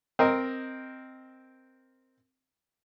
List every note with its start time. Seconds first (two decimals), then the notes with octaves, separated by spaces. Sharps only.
0.19 C4 A#4 D#5